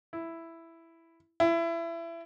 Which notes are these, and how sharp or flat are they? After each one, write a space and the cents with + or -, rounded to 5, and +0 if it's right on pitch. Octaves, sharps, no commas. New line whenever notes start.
E4 +5
E4 +25